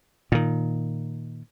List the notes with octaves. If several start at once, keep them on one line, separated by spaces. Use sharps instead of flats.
A#2 D#3